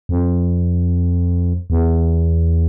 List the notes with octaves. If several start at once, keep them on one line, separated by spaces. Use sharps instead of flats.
F2
E2